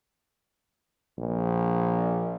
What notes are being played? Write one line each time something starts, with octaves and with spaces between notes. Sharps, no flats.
A#1